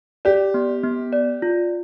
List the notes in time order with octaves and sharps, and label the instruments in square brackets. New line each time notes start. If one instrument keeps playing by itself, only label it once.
[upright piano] G4 [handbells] D5
[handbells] B3
B3
D5
F4